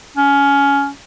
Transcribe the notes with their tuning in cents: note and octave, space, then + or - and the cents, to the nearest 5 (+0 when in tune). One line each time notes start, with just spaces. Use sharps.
C#4 +20